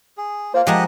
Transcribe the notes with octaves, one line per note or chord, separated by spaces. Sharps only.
G#4
A#3 F4 C5 F5
F3 G#3 G4 A#4 D#5 F#5